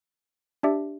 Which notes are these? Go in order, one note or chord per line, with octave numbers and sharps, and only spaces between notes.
D4 G4 D5 E5